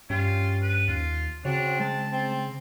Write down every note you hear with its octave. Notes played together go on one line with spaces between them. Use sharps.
G2 C#4 F4 G4
B4
D#2 F4
C#3 C4 D4 F#4 C#5
G#3 A5
C4